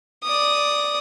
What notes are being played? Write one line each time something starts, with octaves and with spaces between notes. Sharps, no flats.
D5 D#6